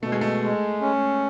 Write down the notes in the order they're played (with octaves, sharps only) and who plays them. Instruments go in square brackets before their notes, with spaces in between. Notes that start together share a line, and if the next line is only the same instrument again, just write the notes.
[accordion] B2 [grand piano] A3
[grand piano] G#3
A3
[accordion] G#3
C#4